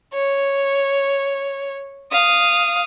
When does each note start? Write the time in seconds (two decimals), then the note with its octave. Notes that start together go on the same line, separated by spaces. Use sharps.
0.14 C#5
2.12 F5 D#6